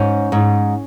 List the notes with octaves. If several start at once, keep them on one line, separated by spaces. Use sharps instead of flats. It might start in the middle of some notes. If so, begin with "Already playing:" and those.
Already playing: G#2 C#4
G#2